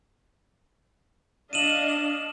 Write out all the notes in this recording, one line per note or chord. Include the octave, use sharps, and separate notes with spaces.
D4 D#5 F5 D#7 E7 F#7